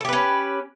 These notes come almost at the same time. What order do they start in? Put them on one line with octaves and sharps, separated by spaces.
A4 G4 B4 C#4